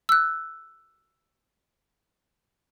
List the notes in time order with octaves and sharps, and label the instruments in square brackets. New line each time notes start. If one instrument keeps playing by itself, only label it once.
[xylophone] E6 F#6